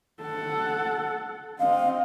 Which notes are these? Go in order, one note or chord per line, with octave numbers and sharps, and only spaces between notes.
A4 F#5
C4 D#5 F5